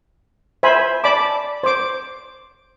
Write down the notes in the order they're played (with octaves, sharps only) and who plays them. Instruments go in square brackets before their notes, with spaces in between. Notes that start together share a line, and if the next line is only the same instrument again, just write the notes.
[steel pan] C5 E5 G#5 B5
D5 A5 B5 D6
C5 D6